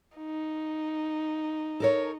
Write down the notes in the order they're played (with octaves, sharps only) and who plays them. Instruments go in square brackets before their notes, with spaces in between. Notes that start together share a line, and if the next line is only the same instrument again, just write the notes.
[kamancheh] D#4
[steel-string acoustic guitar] A4 A#4 C#5